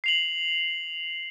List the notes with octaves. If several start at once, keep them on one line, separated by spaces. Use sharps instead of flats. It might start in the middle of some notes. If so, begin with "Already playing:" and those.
C7 F7 F#7